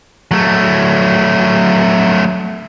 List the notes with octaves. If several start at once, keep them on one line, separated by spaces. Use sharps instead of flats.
F#3 A3